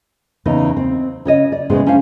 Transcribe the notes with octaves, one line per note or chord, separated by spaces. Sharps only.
E2 C#3 B3 D#4
C4
C#3 C#5 D#5
D5
A2 C#3 G#3 B3 C5
C#4 D4 C5 F5